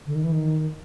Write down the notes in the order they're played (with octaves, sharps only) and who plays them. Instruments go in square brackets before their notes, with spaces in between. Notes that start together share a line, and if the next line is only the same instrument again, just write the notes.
[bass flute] D3
D#3
E3
D#3